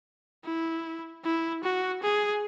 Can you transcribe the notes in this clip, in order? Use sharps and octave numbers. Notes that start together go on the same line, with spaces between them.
E4
E4
F#4
G#4